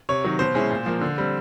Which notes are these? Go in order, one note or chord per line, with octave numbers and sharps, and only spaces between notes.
C3 C#5
D#3 F#3
B2 C5
G#3 C#4 E4
A#2
F3 A#3
D3
G3 C4